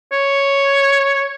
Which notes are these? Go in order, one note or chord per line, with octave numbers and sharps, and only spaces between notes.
C#5